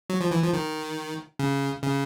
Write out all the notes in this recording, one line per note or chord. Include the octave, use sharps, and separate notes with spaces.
F#3
F3
E3
F3
D#3
C#3
C#3